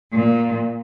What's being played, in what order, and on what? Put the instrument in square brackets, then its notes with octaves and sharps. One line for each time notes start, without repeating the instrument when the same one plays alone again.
[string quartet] A#2